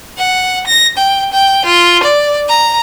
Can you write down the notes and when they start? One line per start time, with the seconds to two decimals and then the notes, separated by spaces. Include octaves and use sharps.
0.18 F#5
0.67 A#6
0.98 G5
1.33 G5
1.65 F4
2.04 D5
2.49 A#5